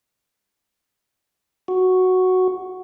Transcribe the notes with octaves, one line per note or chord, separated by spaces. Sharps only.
F#4